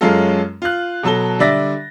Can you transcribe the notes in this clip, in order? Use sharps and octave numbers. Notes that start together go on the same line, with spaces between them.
F#2 G#3 C#4 F4 A4
F4 F#6
B2 F#3 A4 A5 G7
D3 G3 D5 E5 A6 A#6